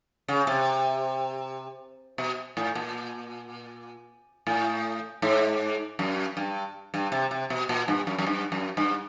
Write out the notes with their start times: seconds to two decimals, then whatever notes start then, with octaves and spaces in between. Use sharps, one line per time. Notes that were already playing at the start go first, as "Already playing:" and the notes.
0.28 C#3
0.47 C3
2.18 B2
2.57 A2
2.75 A#2
4.47 A2
5.22 G#2
5.99 F#2
6.37 G2
6.94 G2
7.12 C3
7.31 C3
7.50 B2
7.69 A#2
7.88 G2
8.07 F#2
8.19 F#2
8.27 G2
8.52 F#2
8.77 G2